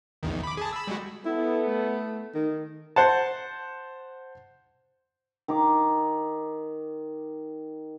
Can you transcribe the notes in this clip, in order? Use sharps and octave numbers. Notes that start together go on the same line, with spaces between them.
A#1 E2 D#3
B5 D6
G#4 A5
B5 E6
G3 G#3 F#4
B3 E4 A4
A3
D#3
C5 F#5 A5
D#3 D6